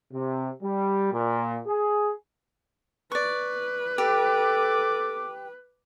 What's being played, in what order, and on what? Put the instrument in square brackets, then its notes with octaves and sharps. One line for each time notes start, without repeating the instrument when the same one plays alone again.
[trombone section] C3
G3
A#2
G#4
[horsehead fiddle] B4 [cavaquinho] D5 C#6
[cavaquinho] G4 [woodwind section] A4 D6